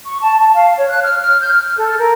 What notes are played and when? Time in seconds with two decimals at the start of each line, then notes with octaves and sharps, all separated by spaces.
0.05 C#6
0.22 A5
0.39 A5
0.54 F5
0.77 C#5
0.90 F#6
1.03 F6
1.21 F6
1.40 G6
1.53 F6
1.78 A4
1.99 A#4